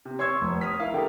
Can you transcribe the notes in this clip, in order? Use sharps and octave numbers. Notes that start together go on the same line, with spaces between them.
C3
C#5 C6 C#6 E6 G#6
F1
D#6 F6 B6
E4 A#4 F5
D3 G4 A#4